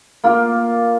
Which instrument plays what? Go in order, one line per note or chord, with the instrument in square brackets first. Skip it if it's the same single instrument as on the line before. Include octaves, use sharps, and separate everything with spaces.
[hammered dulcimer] A#3 F4